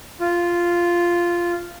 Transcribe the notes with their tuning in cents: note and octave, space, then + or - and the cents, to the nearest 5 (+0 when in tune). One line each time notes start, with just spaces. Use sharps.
F4 -5